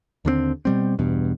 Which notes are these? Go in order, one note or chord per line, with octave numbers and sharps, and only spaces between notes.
D#2 D3 G#3 C4
B2 G3 C4
E2 G2 B2